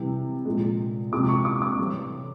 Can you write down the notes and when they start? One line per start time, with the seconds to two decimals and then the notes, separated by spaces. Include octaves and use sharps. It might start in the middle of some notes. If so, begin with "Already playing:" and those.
Already playing: C3 E3 G3
0.45 A#2 F3 G#3
1.12 C3 F3 G#3 D6
1.28 C#6
1.45 D6
1.62 D6
1.78 A2 E3 G3